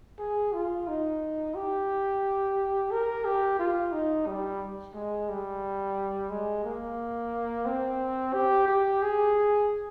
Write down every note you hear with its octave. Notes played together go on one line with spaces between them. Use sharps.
G#4
F4
D#4
G4
A#4
G4
F4
D#4
G3
G#3
G3
G#3
A#3
C4
G4
G4
G#4